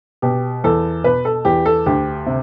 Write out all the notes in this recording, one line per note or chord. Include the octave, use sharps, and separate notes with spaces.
B2 G4
E2 A4
B2 B4
A4
E2 G4
A4
D2 G4
C3